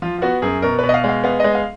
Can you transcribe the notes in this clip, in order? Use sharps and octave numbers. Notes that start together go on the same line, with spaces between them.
F3 F4
F4
B3 F#4
F#2 G#4
B2 A#4
B2 B4
D#5
F5
G#3
F5
B3 F5
G#3 D#5
F5